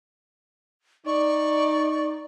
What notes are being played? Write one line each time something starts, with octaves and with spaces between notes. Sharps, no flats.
D#4 D5 C#6